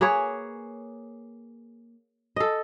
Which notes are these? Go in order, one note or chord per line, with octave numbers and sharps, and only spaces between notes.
A#3 G#4 B4 C#5
A4 D#5